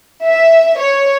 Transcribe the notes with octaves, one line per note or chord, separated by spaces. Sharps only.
E5
C#5